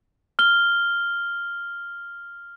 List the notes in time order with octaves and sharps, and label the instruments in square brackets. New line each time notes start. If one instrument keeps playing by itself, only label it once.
[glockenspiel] F6 G7